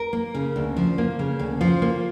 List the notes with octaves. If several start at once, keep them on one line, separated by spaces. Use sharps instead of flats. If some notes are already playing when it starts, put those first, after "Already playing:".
Already playing: A#4
A#3
C#3
D2
F3
A#3
C#3
D2
F3 F4
A#3